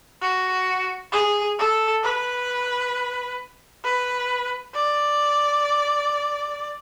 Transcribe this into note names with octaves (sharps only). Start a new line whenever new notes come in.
F#4
G#4
A4
B4
B4
D5